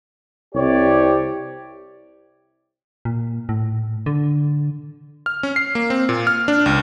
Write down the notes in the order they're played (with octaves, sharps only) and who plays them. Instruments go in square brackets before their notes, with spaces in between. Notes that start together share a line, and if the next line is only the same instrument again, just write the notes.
[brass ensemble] C2 C3 G4 C#5 D5
[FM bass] A#2
A2
D3
[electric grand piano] F6
C#4
C7
A#3
C4
A#2
F6
D4
C#2